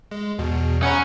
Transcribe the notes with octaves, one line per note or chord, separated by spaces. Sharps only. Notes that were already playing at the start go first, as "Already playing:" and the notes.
G#3
E2 B2
C#4 F#5 A#5 B5